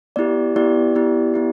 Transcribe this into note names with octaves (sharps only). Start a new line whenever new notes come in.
B3 E4 G4 D5
B3 E4 G4 D5
B3 E4 G4
B3 E4 G4